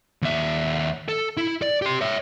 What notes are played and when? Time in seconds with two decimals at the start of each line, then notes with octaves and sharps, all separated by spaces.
0.22 D#2 E5
1.08 A4
1.37 E4
1.62 D5
1.82 G4 C6
2.01 C#5 E5